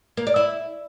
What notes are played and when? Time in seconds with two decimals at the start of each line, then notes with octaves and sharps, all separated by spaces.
0.17 A#3
0.27 D5
0.36 E4